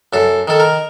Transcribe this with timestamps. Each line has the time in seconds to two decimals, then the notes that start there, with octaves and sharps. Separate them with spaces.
0.13 F#2 A4
0.48 D#3 A4
0.60 A#4